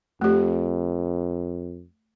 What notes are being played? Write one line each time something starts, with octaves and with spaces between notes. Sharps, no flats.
F2 A3 G4